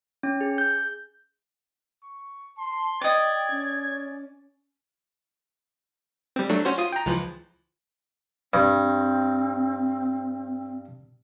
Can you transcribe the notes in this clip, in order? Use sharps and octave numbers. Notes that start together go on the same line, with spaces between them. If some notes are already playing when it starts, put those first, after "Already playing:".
C#4
G#4
G6
C#6
A5 C6
D5 D#5 G5 G#6
C#4
G3 C4
F#3 A3 D4
C#4 F#4 C5
F4 D#6
G5 A#5
C#2 E3 F3
G2 C4